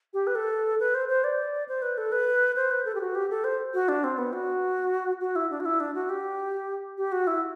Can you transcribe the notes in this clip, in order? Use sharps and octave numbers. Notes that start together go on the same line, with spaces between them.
G4
B4
A4
B4
C5
C5
D5
C5
B4
A4
B4
C5
B4
A4
G4
F#4
G4
A4
C5
F#4
D4
C4
B3
F#4
F#4
E4
D4
F#4
E4
D4
F#4
G4
G4
F#4
E4